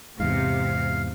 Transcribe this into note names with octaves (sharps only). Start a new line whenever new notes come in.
E2 G#2 C3 F5